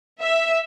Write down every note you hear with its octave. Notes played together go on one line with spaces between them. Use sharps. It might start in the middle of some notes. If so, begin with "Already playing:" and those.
E5